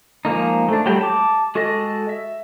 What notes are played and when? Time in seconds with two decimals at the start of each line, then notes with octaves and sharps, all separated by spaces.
0.25 F3 G#3 A#3 D#4
0.69 A3 D4
0.86 F#3 G3 A3 G5
1.01 A5 D6
1.55 G#3 F#4 G#4 A4 D#5
2.09 E5